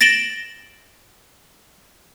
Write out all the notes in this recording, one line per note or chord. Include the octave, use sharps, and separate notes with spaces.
A6 A#6 D7 E7 F#7 G7